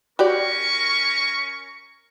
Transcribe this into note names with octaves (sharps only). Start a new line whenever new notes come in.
C#4 F#4 G4 A#4 D5 C#6